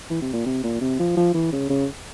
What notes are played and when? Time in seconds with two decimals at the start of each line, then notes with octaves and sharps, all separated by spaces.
0.10 E3
0.22 C3
0.33 A#2
0.46 C3
0.63 A#2
0.81 C3
0.99 F3
1.17 F3
1.34 E3
1.53 C#3
1.69 C#3